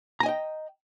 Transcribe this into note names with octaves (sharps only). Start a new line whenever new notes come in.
D#5 G5 G#5 A#5